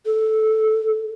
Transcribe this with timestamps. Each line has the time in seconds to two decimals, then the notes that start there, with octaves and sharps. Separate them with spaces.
0.06 A4